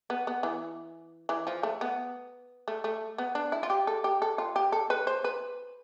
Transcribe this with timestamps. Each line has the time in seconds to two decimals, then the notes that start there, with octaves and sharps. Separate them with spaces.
0.10 B3
0.27 B3
0.43 E3
1.29 E3
1.47 F3
1.63 A3
1.81 B3
2.68 A3
2.84 A3
3.18 B3
3.35 D4
3.52 E4
3.63 F4
3.70 G4
3.87 A4
4.04 G4
4.22 A4
4.38 F4
4.56 G4
4.72 A4
4.90 B4
5.07 C5
5.24 B4